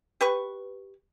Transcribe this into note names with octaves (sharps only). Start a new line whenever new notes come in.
G4 B4 C#6